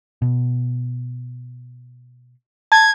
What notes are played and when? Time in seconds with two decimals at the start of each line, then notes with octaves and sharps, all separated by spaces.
0.22 B2
2.72 A5 G#6